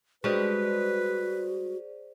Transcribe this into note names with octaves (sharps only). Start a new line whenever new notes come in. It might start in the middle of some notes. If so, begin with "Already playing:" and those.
G3 G#3 D4 F#4 G#4 B4 C5 D5